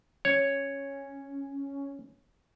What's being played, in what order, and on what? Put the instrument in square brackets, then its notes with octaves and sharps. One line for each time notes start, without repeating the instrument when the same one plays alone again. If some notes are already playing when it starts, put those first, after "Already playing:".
[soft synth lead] C#4 [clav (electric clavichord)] C#5